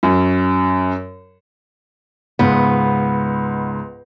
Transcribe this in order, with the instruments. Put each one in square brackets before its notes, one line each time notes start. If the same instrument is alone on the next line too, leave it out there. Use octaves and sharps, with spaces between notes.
[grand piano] F#2
[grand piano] C#2 G#2 G#3 [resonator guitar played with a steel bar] B3